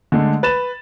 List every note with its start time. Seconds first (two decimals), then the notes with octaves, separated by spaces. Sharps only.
0.12 D3 G#3 A3
0.43 B4 A6 E7